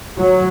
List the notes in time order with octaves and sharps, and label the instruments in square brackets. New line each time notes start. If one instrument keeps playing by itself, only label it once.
[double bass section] F#3